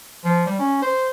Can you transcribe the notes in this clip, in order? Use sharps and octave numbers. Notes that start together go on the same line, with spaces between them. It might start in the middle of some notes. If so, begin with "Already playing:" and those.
F3
G3
C#4
C5